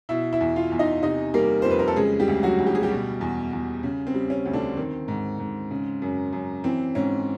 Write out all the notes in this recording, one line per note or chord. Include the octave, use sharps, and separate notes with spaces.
B2 E4 E5
E4 E5
E2
F4 F5
E2
D#4 D#5
C3 D#4 D#5
G3 A#3 A#4
F2 C5
B4
A#4
A4
C#3 G#3 G#4
G3 G4
D2
F#3 F#4
D2
G4
G#4
G3 G4
B2
E2
E2
C#3
C4
G3
C#4
D2
D3 D4
D#3 C4
G#2
G#2
C#3
F#2
F#2
E3 C4
G#2 C#4